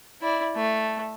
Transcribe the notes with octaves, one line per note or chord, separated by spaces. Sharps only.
E4 D5
A3